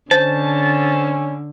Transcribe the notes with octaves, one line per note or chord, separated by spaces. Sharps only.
D3 C#4 C5 A5